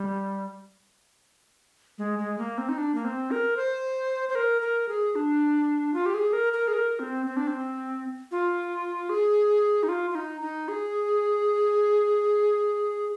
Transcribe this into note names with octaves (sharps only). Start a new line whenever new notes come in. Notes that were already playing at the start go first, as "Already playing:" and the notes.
Already playing: G3
G#3
G#3
A#3
C4
D#4
D4
A#3
C4
A#4
C5
C5
A#4
A#4
G#4
D4
F4
G4
G#4
A#4
A#4
G#4
A#4
C4
C4
D4
C4
F4
G#4
D#4
F4
F4
D#4
D#4
G#4